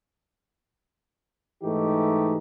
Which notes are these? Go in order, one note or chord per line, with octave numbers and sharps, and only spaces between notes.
G#2 E3 A3 D#4 G4